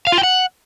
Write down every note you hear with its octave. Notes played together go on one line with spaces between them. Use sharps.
F5
F4
G5
F#5